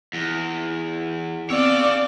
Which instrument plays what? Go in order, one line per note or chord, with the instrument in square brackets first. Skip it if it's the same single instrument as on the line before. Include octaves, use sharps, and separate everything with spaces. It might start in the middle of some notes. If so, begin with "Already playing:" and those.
[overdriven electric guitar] E2
[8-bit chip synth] B3 C4 E6 [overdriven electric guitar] C#5 F5 [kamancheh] D5